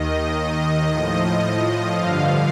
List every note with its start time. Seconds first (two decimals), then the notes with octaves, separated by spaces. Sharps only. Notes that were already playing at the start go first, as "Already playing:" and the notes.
Already playing: D#2 D#3 D#5
0.88 A2 F3
1.94 G2 D3 F3 F5